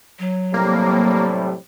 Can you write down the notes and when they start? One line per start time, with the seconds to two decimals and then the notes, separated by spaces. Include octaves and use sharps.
0.19 F#3
0.54 A2 C3 G3 A#3